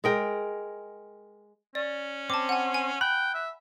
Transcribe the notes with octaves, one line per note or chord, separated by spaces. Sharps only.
G#3 A#4 G5
C#4 D5
C4 A5 D6
F#5 G#5
G#5
G5 B5 F#6
E5